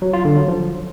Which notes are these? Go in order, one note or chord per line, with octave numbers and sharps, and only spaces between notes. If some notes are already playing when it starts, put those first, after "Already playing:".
F#3
F4
D3
F#3
F3